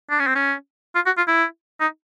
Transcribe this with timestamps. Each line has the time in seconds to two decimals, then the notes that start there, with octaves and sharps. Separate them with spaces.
0.10 D4
0.19 C#4
0.27 C4
0.35 C#4
0.95 F4
1.06 F#4
1.17 F4
1.28 E4
1.80 D#4